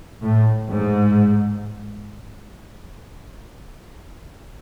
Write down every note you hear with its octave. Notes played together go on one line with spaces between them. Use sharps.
A2
G#2